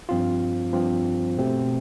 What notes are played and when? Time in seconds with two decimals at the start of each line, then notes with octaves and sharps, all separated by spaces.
0.09 G2 F3 C4 F4
0.73 G2 F3 C4 F4
1.37 B2 A3 C4 G4